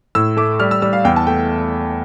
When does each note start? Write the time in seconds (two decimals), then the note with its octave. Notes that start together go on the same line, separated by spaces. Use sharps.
0.15 A2 E6
0.37 A3 D6
0.60 G3 F6
0.71 E6
0.82 G3 E6
0.93 F5
1.05 E2 G5
1.16 A5
1.27 A3 G5